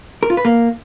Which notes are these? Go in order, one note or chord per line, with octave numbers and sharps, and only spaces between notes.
A#4
F4
B4
A#3